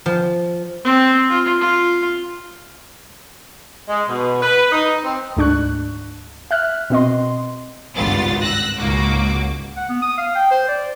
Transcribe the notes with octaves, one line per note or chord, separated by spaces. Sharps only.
F3
C4
F4
F4
G#3
B2
B4
D#4
C4
D2 G#2 D4 C#6 F#6
E5 F6 F#6
B2 C4 D#5 C6
G#1 C#2 G2 B3 F4 A6
E6 F#6 A#6
C#2 G#2 A#3 F#4 D6
F#5
B3
D#6
F5
G5
C5
D5